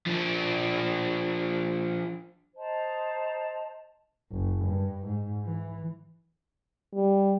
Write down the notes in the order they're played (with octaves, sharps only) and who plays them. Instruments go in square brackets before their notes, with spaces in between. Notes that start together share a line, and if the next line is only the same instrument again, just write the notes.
[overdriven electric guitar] F3 D4
[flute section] C5 D#5 A5 A#5
[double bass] F#1
G2
G#2
E3
[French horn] G3